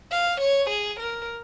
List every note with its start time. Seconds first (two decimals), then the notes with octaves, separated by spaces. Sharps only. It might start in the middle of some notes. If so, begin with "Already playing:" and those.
0.12 F5
0.41 C#5
0.70 G#4
1.00 A#4